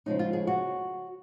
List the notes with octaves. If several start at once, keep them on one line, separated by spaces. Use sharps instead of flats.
C#3 F3 G#3 C#4 D#4
F4
G#4
F#4